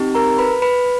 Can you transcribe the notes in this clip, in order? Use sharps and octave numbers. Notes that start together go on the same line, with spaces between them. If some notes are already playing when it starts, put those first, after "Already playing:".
Already playing: C4 D#4 G4
A#4 A#5
B4 B5
B4 B5